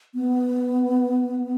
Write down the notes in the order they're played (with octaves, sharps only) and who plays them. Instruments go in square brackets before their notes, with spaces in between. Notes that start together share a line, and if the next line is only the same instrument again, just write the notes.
[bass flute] B3